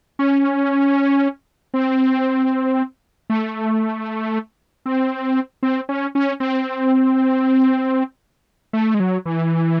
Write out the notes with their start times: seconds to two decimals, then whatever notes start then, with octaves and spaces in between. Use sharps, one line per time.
0.19 C#4
1.74 C4
3.30 A3
4.86 C4
5.63 C4
5.89 C#4
6.15 C#4
6.40 C4
8.73 A3
8.94 G#3
9.00 F#3
9.26 E3